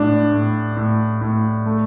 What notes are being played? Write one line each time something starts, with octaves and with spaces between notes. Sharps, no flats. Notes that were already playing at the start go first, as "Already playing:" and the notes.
Already playing: A2 D4
A2
A2
A2
A3